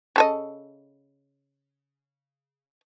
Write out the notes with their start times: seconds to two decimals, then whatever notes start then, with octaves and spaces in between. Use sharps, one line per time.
0.16 C#3 A4 D#5